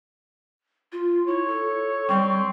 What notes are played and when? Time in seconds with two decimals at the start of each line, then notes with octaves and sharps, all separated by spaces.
0.92 F4
1.27 E4 C#5
1.48 A4
2.09 G3 C4 C#6